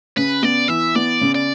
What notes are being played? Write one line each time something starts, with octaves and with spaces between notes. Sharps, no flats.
C#3 B4
B3 D5
E3 E5
B3 D5
C#3
D5